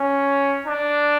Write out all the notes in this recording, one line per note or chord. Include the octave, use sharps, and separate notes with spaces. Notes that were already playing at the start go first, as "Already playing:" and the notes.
Already playing: C#4
D4